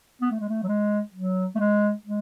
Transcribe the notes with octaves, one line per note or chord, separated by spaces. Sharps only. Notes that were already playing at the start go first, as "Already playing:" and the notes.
B3
A3
G#3
A3
F#3
G#3
F#3
A3
G#3
G#3